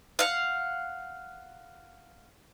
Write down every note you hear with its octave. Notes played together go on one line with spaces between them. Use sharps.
F5 F#5